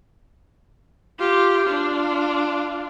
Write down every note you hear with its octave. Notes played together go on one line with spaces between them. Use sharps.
F4 G4
D4 F4